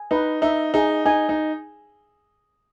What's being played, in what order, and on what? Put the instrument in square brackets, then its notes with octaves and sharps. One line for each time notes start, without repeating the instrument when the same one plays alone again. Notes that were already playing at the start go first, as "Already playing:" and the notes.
Already playing: [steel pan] G#5
[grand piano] D#4 [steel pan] B4
[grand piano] D#4 [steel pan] E5
[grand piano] D#4 [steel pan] G#4
[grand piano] D#4 [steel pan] G#5
[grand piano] D#4